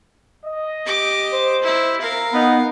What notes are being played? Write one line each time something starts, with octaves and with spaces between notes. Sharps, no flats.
D#5
G4 D6
C5
E4
A#4 F5
B3 D#4 F#5